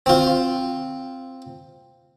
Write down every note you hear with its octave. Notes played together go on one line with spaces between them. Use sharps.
C4 F4